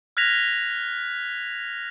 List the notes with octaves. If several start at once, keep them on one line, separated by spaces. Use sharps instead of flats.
F6 F#6 G#6 A#6 B6 F7